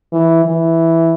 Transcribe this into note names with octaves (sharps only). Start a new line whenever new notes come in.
E3
E3